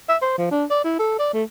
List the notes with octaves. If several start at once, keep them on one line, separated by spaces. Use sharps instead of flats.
E5
C5
F3
D4
D5
E4
A4
D5
A3